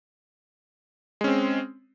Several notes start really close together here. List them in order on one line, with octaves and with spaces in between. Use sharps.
G#3 C#4 C4